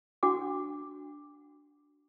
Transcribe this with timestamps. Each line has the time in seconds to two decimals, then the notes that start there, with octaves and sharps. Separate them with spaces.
0.23 D4 F#4 F#5 D6